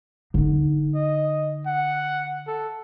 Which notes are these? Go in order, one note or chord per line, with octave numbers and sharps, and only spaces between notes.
D3 D#4
D#5
F#5
A4